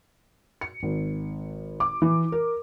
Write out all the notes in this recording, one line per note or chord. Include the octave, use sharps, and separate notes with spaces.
C#7
G#1
D6
E3
A#4